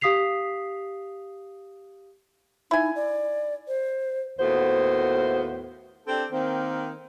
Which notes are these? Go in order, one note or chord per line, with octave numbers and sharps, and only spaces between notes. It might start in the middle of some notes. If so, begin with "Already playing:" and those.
G4 F5 D#6 B6 C7 F7
D#4 E4 G#5
D5
C5
D#2 A2 B3 F#4 C5
C4 D4 G4 A4
D#3 A#3 C4